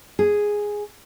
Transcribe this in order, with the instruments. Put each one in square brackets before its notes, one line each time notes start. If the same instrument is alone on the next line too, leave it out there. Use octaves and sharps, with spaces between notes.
[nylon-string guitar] G#4